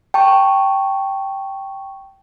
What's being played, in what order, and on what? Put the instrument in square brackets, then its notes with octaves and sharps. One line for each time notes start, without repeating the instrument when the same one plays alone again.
[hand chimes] G5 A5 C#6